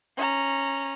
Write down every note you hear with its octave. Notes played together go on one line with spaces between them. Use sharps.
C#4 A#5